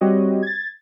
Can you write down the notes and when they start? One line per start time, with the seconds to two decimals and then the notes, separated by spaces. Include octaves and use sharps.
0.01 G3 C4 F#4 G4 C#5 D#5
0.43 G#6 A6